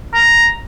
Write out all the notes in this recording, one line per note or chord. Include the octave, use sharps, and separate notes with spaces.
A#5